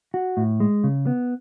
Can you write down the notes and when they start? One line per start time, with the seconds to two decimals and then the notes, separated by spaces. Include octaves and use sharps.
0.14 F#4
0.37 A2
0.60 G#3
0.84 C#3
1.07 B3